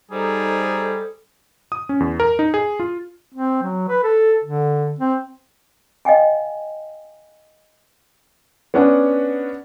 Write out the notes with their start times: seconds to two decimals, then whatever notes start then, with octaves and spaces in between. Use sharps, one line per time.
0.11 G3 D#4 G#4 A4 C5
1.72 D#6
1.89 C#4
2.00 E2
2.20 A#4
2.39 D#4
2.54 G#4
2.80 F4
3.34 C4
3.63 F#3
3.89 B4
4.03 A4
4.44 D3
4.99 C4
6.05 D#5 F5 G5 G#5
8.74 B3 C#4 D4 F#5